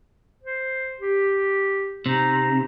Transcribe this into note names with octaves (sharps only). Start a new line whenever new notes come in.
C5
G4
C3 D#4